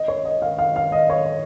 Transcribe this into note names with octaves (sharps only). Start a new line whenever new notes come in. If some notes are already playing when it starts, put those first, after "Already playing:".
Already playing: D#5
C#5
D#5
F5
F5
F5
D#5
C#5